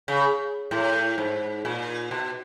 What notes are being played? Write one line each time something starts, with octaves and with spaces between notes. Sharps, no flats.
C#3
A2
G#2
A#2
B2